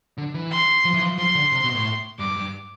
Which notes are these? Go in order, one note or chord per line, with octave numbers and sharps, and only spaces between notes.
D3
E3
C6
F3
E3
F3
F3 C6
D3
C3
B2
A2
G2 D6
G2